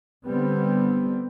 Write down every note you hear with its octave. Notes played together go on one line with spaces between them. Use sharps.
D3 G3 B3 C4